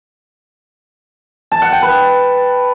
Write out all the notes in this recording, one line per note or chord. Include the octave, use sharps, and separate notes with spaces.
A5
F#5
G5
B4